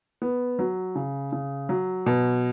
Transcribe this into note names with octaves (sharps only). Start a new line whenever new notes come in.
B3
F#3
C#3
C#3
F#3
B2